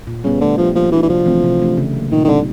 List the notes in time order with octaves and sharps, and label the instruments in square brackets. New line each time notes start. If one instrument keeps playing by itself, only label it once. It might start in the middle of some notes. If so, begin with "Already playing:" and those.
[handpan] A#2
[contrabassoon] C#3 [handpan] G3 B3
[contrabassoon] D3 [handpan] A3
[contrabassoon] F3 [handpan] D4 G4
[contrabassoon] F3 [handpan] A#3
[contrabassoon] E3 [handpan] D4 F#4
[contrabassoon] E3
[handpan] C3 [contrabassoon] F3
[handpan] E3 A3 C4
C3
E3 A3 D4 G4
C#3
F#3 A#3
[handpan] A#2 [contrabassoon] D#3
[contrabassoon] D#3
[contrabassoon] D3 [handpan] G3 C4 D#4